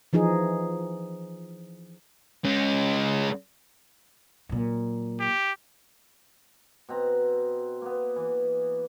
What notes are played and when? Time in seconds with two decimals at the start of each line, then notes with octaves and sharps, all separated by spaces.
0.13 E3 F3 D#4 G#4
2.45 G#3 C#4
4.49 A#2 F#3
5.20 G4
6.89 B2 C4 A#5
7.82 A#3 B3
8.16 E3